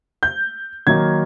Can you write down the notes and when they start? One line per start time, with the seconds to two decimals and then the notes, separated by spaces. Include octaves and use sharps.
0.23 G6
0.87 D#3 F#3 A#3 D#4 G#6